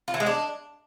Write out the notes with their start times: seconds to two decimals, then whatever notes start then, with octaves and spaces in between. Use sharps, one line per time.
0.08 F4
0.14 E3
0.20 G#3
0.26 D4